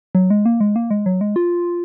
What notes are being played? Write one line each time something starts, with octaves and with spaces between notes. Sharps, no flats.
F#3
G#3
A#3
G#3
A#3
G#3
F#3
G#3
F4